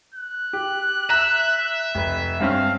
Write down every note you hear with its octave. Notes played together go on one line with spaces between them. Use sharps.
F#6
G4
E5 A#5 E6
F1 B4
G2 C4 C#4 F5